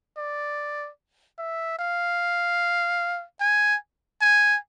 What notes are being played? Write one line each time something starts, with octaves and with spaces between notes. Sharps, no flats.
D5
E5
F5
G#5
G#5